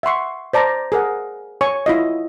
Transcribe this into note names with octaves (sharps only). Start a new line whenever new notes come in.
E5 F#5 C6 C#6
C5 D5 A5 A#5
G#4 A#4 F#5
C#5 G#5 C#6
E4 F4 D#5